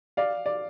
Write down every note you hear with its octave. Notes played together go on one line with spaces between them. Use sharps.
D5 F5
D5